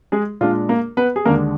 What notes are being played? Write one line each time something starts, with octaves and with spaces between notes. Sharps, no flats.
G#3 G#4
A#2 G#3 D4 F4
A#3 A#4
B3 B4
G#4
D#2 D3 G#3 A#3 D4 A#4